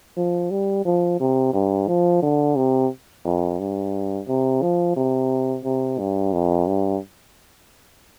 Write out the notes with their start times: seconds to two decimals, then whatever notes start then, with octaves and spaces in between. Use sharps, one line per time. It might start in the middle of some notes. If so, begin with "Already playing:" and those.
0.17 F3
0.51 G3
0.85 F3
1.20 C3
1.53 G2
1.88 F3
2.22 D3
2.56 C3
3.25 F2
3.59 G2
4.28 C3
4.62 F3
4.97 C3
5.64 C3
5.99 G2
6.33 F2
6.67 G2